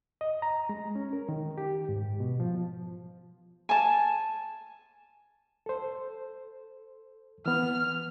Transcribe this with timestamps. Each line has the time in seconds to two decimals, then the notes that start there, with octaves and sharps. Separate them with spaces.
0.21 D#5
0.42 A#5
0.69 G#3
0.95 C#4
1.13 A#4
1.29 D#3
1.58 G4
1.89 G#2
2.20 B2
2.40 F3
3.69 G#5 A5
5.66 A4 C5
7.46 E3 B3 F6